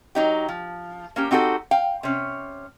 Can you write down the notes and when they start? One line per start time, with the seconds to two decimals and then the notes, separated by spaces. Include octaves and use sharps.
0.15 F#3 D#4 G4
0.48 F3
1.16 A#3 C#4 G4
1.31 C4 D#4 F#4 G4 A4
1.71 F5 G5
2.03 C3 C#4